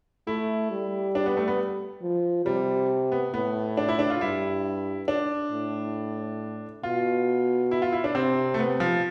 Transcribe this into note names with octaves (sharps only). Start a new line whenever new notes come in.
A3 E4
G3
D4
B3
A3
B3
F3
C3 G3
B3
A2 B3
D4
E4
D4
F4
G2 E4
D4
A2
B2 F4
E4
F4
E4
D4
C3 C4
A3
B3
F3